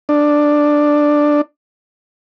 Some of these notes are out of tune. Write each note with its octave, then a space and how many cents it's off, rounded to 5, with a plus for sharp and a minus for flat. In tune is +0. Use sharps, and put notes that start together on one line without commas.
D4 +5